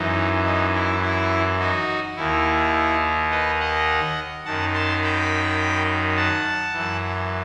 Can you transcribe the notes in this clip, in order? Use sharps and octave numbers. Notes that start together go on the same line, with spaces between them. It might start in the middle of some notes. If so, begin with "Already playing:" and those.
Already playing: F#2 E3 D#4
D#4
E4
E4
D#4 F#4
D#2 D#3 E4
B4 D#5
D#5 F#5
F#2 D#3 F#5 A5
A5 C6
G5 B5
F#5 A5
F#2 E3